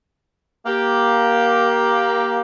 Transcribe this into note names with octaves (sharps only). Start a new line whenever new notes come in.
A#3 G4